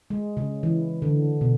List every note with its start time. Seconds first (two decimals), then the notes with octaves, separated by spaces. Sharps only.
0.10 G#3
0.37 C#3
0.63 E3
1.02 D3
1.41 B2